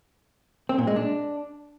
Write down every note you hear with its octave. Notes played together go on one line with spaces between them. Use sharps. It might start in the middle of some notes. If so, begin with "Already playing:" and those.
C4
A#2
G#3
D4